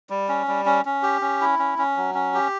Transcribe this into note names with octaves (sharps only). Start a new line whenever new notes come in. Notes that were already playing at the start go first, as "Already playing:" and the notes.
G3
C#4
G3
C#4
C#4
G4
C#4
E4
C#4
C#4
F#3
C#4
G4